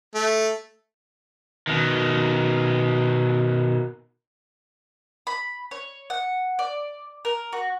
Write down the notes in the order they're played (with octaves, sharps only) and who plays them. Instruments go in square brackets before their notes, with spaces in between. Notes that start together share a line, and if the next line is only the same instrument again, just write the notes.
[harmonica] A3
[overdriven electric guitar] B2 D#3
[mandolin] B5
C#5
F#5
D5
A#4
F#4